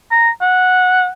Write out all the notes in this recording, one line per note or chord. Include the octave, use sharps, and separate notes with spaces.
A#5
F#5